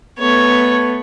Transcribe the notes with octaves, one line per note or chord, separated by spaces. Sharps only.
A3 B3 C#5